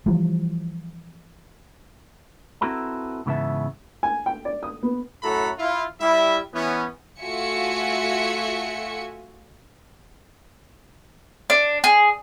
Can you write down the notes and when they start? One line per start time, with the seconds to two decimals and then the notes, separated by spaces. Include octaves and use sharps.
0.06 E3 F3 G3
2.61 C4 E4 F#4 A4 B4 A#5
3.26 G#2 C#3 E3 B3 E5 A5
4.03 G#5
4.26 G5
4.45 D5
4.63 D#6
4.83 B3
5.23 F#2 A2 F#4 A4 A#5 B5
5.58 E4 F4
6.01 G3 E4 E5
6.54 E3 B3 C#4
7.20 A3 F4 F#4 E5 G#5 C#7
11.50 D4
11.84 G#4